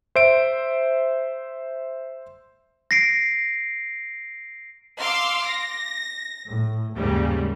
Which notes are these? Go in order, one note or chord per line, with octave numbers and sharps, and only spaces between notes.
C5 E5 D7
A#6 C7 D7
F5 C6 D6 E6
A#6
A2
D#2 G#2 C#3 G3